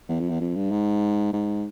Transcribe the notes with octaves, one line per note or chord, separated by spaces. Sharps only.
E2
F2
E2
F2
G2
G#2
G#2